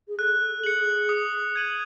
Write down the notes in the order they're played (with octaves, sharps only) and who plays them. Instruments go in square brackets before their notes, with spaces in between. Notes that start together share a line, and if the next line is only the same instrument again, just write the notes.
[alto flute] G#4
[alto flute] A4 [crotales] F#6
[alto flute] G#4 [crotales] C#7 F#7
[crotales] D#6
G#6 D#7 F#7